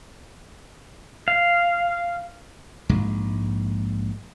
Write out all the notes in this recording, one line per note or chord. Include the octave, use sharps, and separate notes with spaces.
F5
A#1 G#2 G#3